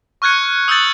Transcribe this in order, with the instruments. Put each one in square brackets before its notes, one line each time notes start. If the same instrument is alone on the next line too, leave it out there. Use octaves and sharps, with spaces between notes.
[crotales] C#6 F6 F#6 G#6 C#7
D#6 E6 F#6 G6 A6 F#7